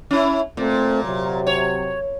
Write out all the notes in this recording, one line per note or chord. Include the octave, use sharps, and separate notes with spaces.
C#4 E4
A#2 A3 C4
C3 F#3
C#5